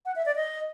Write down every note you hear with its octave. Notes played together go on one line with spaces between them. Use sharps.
F#5
E5
D5
D#5